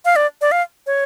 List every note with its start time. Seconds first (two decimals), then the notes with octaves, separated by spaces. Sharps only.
0.05 F5
0.16 D5
0.41 D5
0.52 F5
0.87 C#5